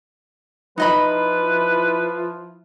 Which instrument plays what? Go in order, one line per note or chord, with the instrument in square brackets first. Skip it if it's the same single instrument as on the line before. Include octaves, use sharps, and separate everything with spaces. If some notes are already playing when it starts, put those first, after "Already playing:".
[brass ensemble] F3 E4 [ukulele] D#4 D#5 B5 [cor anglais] B4